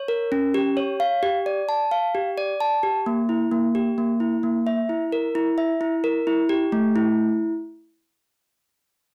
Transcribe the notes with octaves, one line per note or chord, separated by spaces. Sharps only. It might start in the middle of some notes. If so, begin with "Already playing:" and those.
Already playing: C#5
A#4
C#4
G4
C#5
F5
G4
D5
A5
F5
G4
D5
A5
G4
A#3
E4
A#3
G4
A#3
E4
A#3
E5
E4
A#4
E4
E5
E4
A#4
E4
G4
A3
E4